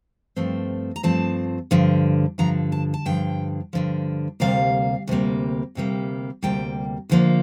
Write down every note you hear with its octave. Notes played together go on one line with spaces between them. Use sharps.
G2 F3 A3 C4
A#5
G2 F3 A3 C4 A5
G2 D3 F3
G2 D3 F3 A#5
A5
A5
G2 D3 F3 G5
G2 D3 F3
D2 C3 G3 A#3 F5
D2 C3 G3 A#3
D2 C3 G3 A#3
D2 C3 G3 A#3 G5
D2 D3 F3 A#3